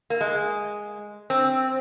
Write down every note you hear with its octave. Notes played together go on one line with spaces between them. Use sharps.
A#3
G#3
C4